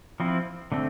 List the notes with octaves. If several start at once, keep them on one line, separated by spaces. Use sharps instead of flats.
F3 C4 E4
D3 A3 C4